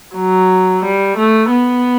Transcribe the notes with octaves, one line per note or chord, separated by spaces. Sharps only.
F#3
G3
A3
B3